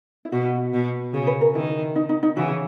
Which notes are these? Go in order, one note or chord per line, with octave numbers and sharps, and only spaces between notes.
E4
B2 F#4
B2
C#3 G#4
B4
A#4
D#3 E4
D#4
D#4
D#4
C#3 E3 F#4